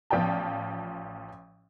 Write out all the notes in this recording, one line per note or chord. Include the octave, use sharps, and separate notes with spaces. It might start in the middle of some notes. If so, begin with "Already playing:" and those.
A1 F3 D5 G5 A5